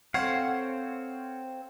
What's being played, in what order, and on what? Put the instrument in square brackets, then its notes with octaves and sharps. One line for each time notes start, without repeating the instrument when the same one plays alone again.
[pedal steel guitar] C4 C#5 F5 [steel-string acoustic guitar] A4 C5 F#5